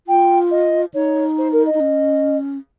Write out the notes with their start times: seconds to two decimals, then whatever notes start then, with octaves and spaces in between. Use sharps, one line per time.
0.07 F4 G5
0.51 D#5
0.94 D#4 C#5
1.37 C5
1.52 A#4
1.66 D#5
1.74 D#4
1.80 C#4